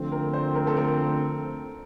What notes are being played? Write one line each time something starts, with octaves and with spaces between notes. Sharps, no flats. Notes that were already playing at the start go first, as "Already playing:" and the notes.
Already playing: D3 F3 A3 C4
A#4
C5
A#4
A4
A#4